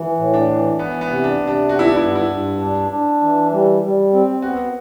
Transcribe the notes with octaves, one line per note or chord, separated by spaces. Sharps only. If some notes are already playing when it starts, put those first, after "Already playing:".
Already playing: E3 F#4
A2
D4
E3
E3 B3
B3
C3
D4
C3
D4
B3 F#4
E4
D4
G2 E4
E4
G2
D4
D4
E3
G3
G3
C4
B3 F#4